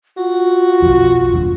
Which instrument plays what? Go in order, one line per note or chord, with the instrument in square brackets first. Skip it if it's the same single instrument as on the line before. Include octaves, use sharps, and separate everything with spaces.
[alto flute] F4 [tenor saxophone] F#4
[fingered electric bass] B1 F2
F1 E2 G2